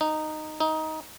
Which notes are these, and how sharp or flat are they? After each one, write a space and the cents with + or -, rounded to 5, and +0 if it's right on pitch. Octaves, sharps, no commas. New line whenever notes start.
D#4 -10
D#4 +15